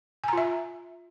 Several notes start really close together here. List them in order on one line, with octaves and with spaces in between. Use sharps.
G#5 A#5 F4 E5